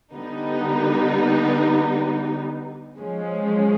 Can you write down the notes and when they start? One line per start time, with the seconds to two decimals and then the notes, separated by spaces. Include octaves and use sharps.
0.14 D3 G3 B3 D#4
2.99 F3 G#3 C#4